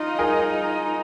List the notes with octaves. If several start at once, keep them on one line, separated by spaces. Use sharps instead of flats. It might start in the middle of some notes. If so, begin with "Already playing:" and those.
Already playing: D#4 F4
G#4 A#4